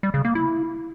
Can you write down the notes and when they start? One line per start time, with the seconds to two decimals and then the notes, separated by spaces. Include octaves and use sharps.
0.03 G3
0.14 C#3
0.25 A#3
0.35 E4